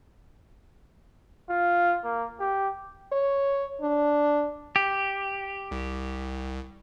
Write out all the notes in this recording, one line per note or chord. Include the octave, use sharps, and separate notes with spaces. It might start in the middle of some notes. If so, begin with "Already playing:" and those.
F4
A#3
G4
C#5
D4
G4
C2